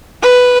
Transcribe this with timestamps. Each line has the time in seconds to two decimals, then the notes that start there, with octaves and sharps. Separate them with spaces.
0.22 B4